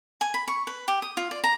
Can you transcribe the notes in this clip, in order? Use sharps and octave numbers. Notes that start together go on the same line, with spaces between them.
G#5
B5
C#6
B4
G4
D#6
F4
D5
A#5